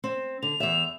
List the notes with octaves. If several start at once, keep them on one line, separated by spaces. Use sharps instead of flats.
C4
D3 F7
E2 E5